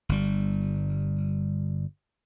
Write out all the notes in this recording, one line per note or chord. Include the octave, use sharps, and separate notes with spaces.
G1 G3